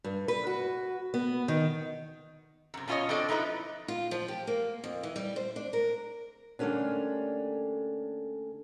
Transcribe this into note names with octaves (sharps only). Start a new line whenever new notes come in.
G2
B4
F#4
B3
D#3
F#2 C3
B2 C#4 F4 G4 C#5 D#5
C4 D4 A4 D5 D#5
F3 D#4 E4 A#4 B4
F4
F3
G4
A#3
F2
E3
G3
C5
D4
A#4
D3 G3 A3 A#3 C#4 D4